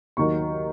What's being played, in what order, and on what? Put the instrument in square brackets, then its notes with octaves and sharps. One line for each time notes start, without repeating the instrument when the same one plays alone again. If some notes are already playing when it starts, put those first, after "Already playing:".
[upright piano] D#2 D#3 F#3 C#6